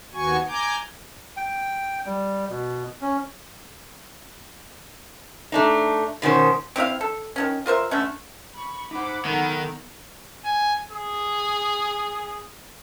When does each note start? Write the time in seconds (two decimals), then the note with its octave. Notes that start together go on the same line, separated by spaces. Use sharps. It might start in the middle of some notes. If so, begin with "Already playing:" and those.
0.13 D#2 B3 F#4 G#5 C#6
0.48 G#5 A#5 D6 G6
1.37 G5
2.06 G3
2.50 B2
3.01 C#4
5.52 A3 D4 D#4
6.22 B2 D#3 C#4 C5
6.76 C4 E4 D5 F5
7.01 A4
7.36 D#3 F3 C#4
7.66 F4 A#4 C5 E5
7.91 D3 A3 C#4
8.54 B5 C#6
8.91 D#4 C5 F#5 B5 D6
9.25 D#3 B3 D#4 A4 A#4
10.45 G#5
10.91 G#4